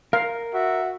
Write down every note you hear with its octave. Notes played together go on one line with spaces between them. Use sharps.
A#4 F5
F#4 E5